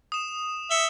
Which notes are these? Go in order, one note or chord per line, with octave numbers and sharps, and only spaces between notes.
D#6 E7
E5 C#7 G7